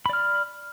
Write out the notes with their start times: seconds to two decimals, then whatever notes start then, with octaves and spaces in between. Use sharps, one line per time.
0.06 B5
0.09 D5
0.13 F6